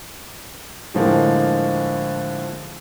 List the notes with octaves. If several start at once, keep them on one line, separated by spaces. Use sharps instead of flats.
A2 D3 F3 G#3 A#3